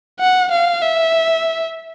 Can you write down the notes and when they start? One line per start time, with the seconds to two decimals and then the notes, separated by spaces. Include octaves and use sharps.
0.20 F#5
0.51 F5
0.82 E5